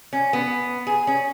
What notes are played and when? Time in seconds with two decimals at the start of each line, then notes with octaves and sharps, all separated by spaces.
0.13 C#4
0.33 B3
0.87 G#4
1.07 C#4